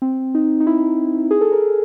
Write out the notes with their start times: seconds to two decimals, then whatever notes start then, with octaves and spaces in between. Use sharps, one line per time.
0.02 C4
0.35 D#4
0.60 D#4
0.67 E4
1.31 G#4
1.41 A4
1.52 A#4